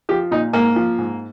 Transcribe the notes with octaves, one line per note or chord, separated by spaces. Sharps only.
F3 G4
A#2 D#4
G#2 A#3
F3
G#2